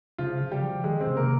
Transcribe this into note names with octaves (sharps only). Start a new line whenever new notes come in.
C#3 F3 F4
C#3
G3 G4
F3
D#3 G#3 G#4
C4 C5
C#3
C3 A#3 A#4